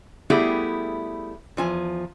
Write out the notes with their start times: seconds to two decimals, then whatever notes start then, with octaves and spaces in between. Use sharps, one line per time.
0.30 G3 A3 B3 E4 G4 G#4
1.57 E2 F3 G#5